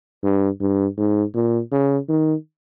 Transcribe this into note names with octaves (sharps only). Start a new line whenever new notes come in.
G2
G2
G#2
A#2
C#3
D#3